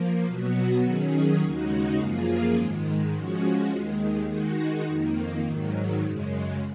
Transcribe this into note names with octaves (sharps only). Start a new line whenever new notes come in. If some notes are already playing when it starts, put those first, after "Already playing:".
Already playing: F3 A#3
B2 F#3 B3 F#4
D#3 F#3 C#4 G#4
D#2 C#3 G#3 D#4 F#4
F#2 F3 A#3 F4 G#4
G#2 D#3 G#3
F3 G#3 C#4 F#4
D#2 D#3 G#3
D#3 G#3 D#4 F#4
F2 D#3 A#3
G#2 D#3 F#3
F#2 C#3 G#3